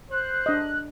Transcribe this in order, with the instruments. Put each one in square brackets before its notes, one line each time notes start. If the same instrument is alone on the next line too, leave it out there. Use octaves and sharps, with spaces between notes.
[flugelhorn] C5 [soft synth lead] F#6
[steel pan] D4 D#5